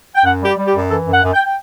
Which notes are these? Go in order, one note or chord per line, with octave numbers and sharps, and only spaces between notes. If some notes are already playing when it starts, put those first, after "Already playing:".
G5
F#2 F#5
G3 G4
G3
G4
F#2
E3 A4
F#2
F#5
F#2
G5
G5